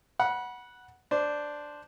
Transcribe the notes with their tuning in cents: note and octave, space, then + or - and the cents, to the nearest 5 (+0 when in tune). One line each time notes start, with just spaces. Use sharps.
F#5 +0 B5 -30
D4 +0 C5 -5